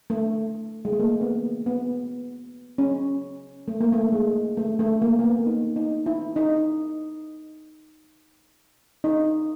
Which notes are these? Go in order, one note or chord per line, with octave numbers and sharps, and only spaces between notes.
A3
G#3
A3
A#3
B3
B3
C#4
A3
A#3
A3
G#3
A3
A3
A#3
A#3
B3
D#4
D#4
E4
D#4
D#4